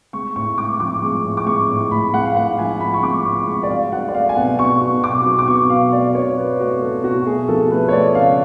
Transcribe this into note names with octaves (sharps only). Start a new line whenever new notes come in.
G#3 C#6
A2 C#6
G#3 D6
F3 D6
G#3 C#6
A2
D6
G#3 C#6
A2
A2 B5
G#3 F#5
F5
A2 F#5
F3 G#5
A2 B5
C#6
G#3 D6
A2 C#6
G#3 C#6
D5
F#3 F5
F#3 F#5
D5
A3 F5
G#5
B2 F#5
F#3 C#6
B2
B2 D6
F#3
D6
B2 C#6
B2 F5
A3 D5
B2 C#5
F#3 B4
A3 F#4
F#3 A4
B2 F#4
A3 G#4
F3 A4
A3 B4
C#5
A3 D5
C#3 F5